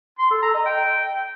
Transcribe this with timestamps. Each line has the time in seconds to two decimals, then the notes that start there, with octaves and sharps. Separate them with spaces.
0.19 C6
0.31 A4
0.42 A#5
0.54 D#5
0.66 G5